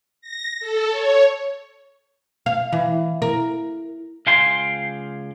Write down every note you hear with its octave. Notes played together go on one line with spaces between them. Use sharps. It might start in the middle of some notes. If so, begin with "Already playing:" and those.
A#6
A4
C#5
F5
E3
A#4
C#2 F5 G5 G#5 C6